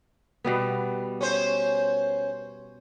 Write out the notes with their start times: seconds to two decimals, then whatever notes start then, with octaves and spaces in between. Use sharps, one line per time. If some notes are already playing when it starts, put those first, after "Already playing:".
0.44 B2 G3 B3
1.21 C#4 C5